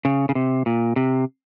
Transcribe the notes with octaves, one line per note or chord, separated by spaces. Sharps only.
C#3
C#3
C3
A#2
C3